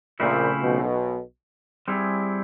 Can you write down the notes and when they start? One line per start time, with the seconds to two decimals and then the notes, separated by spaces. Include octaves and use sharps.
0.20 A#1 A#2 C#3 F3 A3 C4 E4
0.62 B1 B2
1.88 G3 C4 E4 G#4